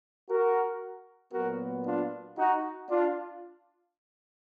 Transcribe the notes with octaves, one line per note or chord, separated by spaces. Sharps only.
F#4 A#4
A#2 F#3 B3 F#4 A#4
D4 F4
D#4 F#4
D4 F4